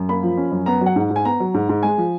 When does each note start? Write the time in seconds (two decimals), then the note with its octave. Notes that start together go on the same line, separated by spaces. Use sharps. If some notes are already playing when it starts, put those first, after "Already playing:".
Already playing: F#2
0.09 A#3 B5
0.23 F3
0.37 C#4
0.52 F#2
0.66 B3 A#5
0.81 F#3
0.86 F#5
0.96 G#2
1.10 G#2
1.16 G#5
1.25 B3 A#5
1.40 F#3
1.54 G#2
1.69 G#2
1.83 G#3 G#5
1.98 F3